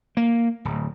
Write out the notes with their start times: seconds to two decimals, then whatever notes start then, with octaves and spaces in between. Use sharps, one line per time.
0.17 A#3
0.65 D1